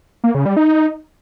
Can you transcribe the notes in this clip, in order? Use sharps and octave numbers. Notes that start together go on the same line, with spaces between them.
A#3
C#3
G3
D#4